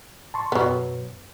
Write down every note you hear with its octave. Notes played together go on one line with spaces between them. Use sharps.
A5 C6 C#6
F#2 B2 F#3 B3